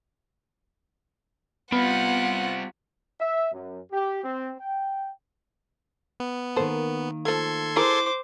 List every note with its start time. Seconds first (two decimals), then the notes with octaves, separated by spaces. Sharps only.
1.72 G3 B3 C4 F4 F#5
3.20 E5
3.53 F#2
3.92 G4
4.24 C4
4.60 G5
6.20 B3
6.56 D#3 A#3 A4 C5
7.25 F3 A3 A4 C6 G#6
7.76 E4 G#4 A#4 C5 D6